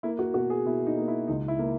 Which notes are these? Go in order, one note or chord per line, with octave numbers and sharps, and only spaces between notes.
A#3 E4
F#4
B2 F#4
G#4
B2 E4
D#4
A#3
E4
C#2 D#4
E4
A#3